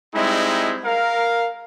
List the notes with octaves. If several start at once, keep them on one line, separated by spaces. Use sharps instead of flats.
G3 G#3 C4 D#4 E4
A#4 F5